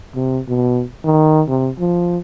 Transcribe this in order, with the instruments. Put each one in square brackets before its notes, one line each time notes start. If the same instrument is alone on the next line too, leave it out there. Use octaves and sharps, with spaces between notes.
[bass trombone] C3
B2
D#3
C3
F3